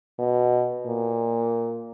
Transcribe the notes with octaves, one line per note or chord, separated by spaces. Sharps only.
B2
A#2